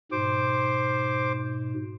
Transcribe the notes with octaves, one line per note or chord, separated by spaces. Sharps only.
G#2 B2 C5 D6